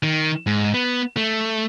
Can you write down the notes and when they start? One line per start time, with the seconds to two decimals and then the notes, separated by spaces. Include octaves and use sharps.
0.03 D#3
0.47 G#2
0.74 B3
1.17 A3